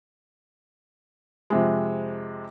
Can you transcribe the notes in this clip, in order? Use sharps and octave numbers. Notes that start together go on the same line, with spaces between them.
F2 C3 G#3